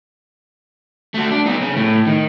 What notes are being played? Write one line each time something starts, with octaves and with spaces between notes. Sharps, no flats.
A3 F#4
D4
B2 D#4
C#3
A2
D#3